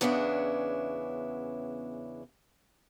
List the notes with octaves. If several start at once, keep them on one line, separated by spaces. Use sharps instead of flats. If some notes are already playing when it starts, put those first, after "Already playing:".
E2 C#3 B3 C#4 D4 E4